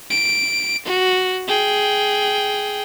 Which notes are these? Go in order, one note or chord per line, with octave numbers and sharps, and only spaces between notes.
D7
F#4
G#4 G5